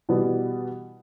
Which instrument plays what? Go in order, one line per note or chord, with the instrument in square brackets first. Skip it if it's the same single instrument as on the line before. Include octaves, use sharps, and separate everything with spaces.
[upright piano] B2 E3 G3 B3